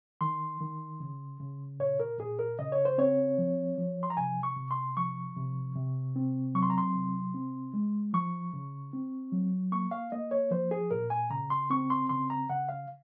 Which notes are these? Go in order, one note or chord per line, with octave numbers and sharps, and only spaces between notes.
D#3 C6
D#3
C#3
C#3
A#2 C#5
A#4
A#2 G#4
A#4
C#3 D#5
C#5
C5
C4 C#5
F3
F3
C6
A#5
C3 G#5
C#6
C3
C6
F3 C#6
C3
C3
C4
F#3 C#6
C6
A#5
C6
C3
C4
G#3
F3 C#6
C#3
C4
F#3
A#3 C#6
F5
A#3 D#5
C#5
F3 C5
G#4
A#2 A#4
G#5
C#3 A#5
C6
C4 C#6
C6
C#3 C6
A#5
C#3 F#5
F5